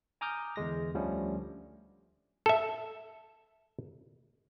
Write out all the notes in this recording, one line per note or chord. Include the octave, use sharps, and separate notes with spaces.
G#5 A#5 D6 D#6 F6 G6
E2 D3 G#3 A#6
D2 D3 F3 G3 A3 C#4
A4 E5